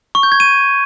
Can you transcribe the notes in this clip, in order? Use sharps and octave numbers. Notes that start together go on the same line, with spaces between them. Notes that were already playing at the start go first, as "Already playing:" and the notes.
C#6
G6
G#6
D#7